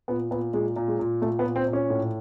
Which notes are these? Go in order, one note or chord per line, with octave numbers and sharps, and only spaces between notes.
A#2 B3
A#2 B3
A#2 G#3
A#2
G#3
A#2
A#2 A3
B3
A#2
C4
A#2
C#4
A2